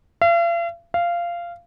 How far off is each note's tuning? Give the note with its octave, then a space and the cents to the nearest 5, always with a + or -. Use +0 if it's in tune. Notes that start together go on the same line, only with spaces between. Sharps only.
F5 -45
F5 -15